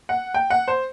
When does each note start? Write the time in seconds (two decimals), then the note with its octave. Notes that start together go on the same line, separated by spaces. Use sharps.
0.09 F#5
0.34 G5
0.50 F#5
0.68 C5